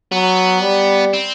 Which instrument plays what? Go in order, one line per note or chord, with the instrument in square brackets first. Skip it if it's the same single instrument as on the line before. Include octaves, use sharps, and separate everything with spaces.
[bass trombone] F#3 [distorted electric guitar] B3
[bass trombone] G3
[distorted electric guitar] C4